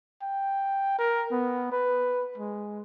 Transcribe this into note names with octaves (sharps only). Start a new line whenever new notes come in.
G5
A#4
B3
B4
G#3